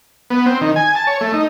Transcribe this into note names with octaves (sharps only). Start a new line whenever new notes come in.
B3
C4
D#3
G#5
A5
C#5
A3
D#4